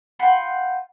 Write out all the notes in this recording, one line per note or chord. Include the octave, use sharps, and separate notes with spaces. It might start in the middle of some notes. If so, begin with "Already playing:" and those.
F4 F#5 G5 B5